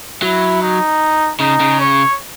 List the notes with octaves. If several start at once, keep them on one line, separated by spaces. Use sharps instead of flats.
F#3 E4
D#4
C#3 D#4
C#3
C#5